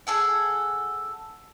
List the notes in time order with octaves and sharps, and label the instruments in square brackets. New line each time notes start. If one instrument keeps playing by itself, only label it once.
[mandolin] G#4 A4 F#5